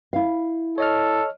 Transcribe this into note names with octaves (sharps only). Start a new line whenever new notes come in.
E4 F5
A4 C#5 D#5 F6